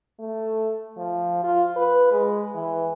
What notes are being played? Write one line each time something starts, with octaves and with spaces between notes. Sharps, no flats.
A3
F3
F4
B4
G#3
E3